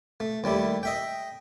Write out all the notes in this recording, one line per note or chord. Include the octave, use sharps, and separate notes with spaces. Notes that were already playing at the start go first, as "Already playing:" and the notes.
A3
D#2 G3 A3 E4
D#5 E5 G5